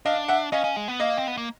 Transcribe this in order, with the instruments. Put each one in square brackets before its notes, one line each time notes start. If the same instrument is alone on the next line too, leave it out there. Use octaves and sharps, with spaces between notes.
[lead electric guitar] D4 [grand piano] D#5 F5
[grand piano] E5 F#5
[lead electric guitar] C#4 [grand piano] D#5 F5
[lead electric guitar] C#4
G#3
B3
[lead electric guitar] A#3 [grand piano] D#5 F5
[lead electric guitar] C4
B3
A#3